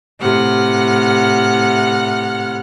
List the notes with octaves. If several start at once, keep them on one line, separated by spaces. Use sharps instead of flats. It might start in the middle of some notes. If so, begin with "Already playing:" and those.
A2 C3 F#5 F6